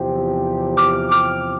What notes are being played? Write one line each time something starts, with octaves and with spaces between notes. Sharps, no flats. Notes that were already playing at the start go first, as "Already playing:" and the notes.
Already playing: E2 C3 F3 C4 G4
D6 F6
D6 F6